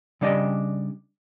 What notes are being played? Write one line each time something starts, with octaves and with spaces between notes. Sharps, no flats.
C#3 G3 D4 D5 D#5 G#5